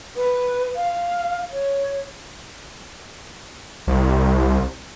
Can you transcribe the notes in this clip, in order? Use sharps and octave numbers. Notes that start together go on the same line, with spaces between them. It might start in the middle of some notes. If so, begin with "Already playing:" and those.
B4
F5
C#5
C2